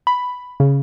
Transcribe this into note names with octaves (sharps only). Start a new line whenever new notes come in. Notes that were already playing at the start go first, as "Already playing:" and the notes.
B5
C#3